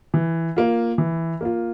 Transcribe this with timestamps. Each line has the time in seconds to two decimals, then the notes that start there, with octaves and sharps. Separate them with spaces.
0.14 E3
0.56 A#3 F4
0.98 E3
1.41 A#3 F4